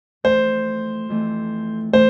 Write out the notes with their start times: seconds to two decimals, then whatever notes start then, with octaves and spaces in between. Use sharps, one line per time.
0.24 F2 E3 A3 C5
1.09 F2 E3 A3
1.93 E3 A3 C5